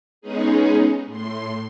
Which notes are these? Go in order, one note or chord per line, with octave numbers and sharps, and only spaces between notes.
G#3 B3 C#4 D#4 G#4
A2 C6